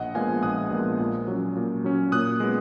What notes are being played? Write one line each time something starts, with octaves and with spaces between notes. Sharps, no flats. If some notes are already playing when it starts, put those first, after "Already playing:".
Already playing: A#1 D#5 F#5
A#2 F3 G#3 B3 F5 G#5
A#1 D#6 F#6
A#2 F3 G#3 B3
A#2
F#3 C#4
A#2
F#3 C#4
A#2 D#6 F#6
G#3 B3